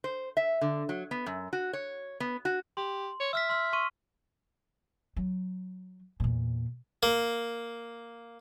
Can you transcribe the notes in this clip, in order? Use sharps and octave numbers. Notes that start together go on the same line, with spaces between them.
C5
E5
D3
F#3
B3
F#2
F#4
C#5
B3
F#4
G4 C6
C#5
E5 E6 F6 B6
C6 F6
C6 C#6 D#7
F#3
E2 A#2
A#3